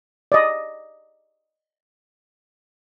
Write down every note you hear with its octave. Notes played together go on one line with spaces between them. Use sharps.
D5 D#5